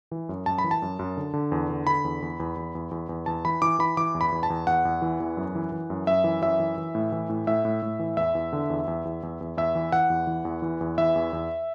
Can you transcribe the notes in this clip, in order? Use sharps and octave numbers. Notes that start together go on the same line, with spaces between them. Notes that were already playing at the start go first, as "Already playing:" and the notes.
E3
F#2
F#2 A5
B5
E3
A5
F#2
F#2
D3
D3
E2
D3
D3 B5
E2
E2
E2
E2
E2
E2
E2
E2 A5
E3 B5
E3 D6
E3 B5
E3 D6
E2
B5
E2
A5
E2
E2 F#5
E2
E3
E2
F#2
E3
E3
F#2
F#2 E5
E3
F#2 E5
E3
E3
A2
E3
A2
A2 E5
A2
A2
E3
E2 E5
E2
D3
E2
E2
E2
E2
E2
E2 E5
E3
E3 F#5
E2
E3
E2
E3
E2
E3 E5
E2
E2